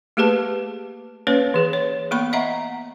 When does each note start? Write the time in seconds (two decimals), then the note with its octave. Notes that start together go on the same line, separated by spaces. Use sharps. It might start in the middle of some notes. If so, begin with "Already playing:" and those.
0.17 A3 A#3 G4 G#4 B4 A5
1.27 A#3 C#4 B4 C#5
1.54 E3 G#4
1.73 C#5
2.11 A#3 B3 B5 C#6
2.33 D#5 E5 F#5 A#5